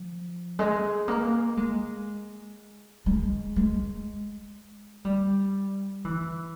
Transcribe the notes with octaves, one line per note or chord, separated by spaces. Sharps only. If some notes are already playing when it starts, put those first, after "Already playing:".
Already playing: F3
G#3
A#3
G#3
G#3
G#3
G3
E3